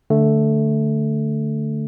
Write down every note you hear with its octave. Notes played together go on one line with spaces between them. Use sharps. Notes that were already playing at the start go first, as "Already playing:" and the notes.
D3 A3